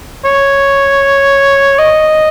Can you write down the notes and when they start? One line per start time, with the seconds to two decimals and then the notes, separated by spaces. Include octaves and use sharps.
0.25 C#5
1.79 D#5